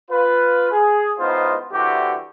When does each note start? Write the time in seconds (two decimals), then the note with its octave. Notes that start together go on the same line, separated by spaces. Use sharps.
0.11 F4 B4
0.72 G#4
1.19 C#2 A2 B3 D#4 F4 C5
1.73 C2 D3 E3 F#4 G4